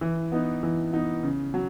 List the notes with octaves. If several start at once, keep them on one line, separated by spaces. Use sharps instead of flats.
E3
B3 D#4
E3
B3 D#4
C#3
F#3